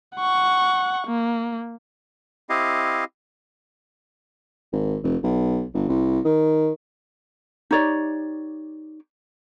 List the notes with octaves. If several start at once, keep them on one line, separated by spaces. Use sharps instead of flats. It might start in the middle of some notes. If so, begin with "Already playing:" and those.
F#5 C#6
A#3
C4 E4 G4 D#5 F5
G#1
F1
B1
G1
C2
D#3
D#4 G4 C#5 D5